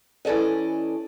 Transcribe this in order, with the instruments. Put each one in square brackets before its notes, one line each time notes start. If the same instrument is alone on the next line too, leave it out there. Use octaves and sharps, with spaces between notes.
[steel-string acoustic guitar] E3 C#4 A4 D5 D#5